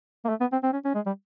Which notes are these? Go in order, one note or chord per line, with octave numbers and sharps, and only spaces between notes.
A#3
A3
B3
C4
C4
C#4
C#4
G#3
G3